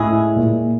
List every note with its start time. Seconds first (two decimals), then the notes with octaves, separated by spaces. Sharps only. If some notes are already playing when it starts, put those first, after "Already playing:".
Already playing: A2 G#3 C#4 E4 G#4
0.36 A#2